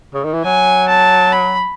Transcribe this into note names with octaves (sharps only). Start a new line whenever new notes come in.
C#3
D#3
E3
F#3 G#5
A5
B5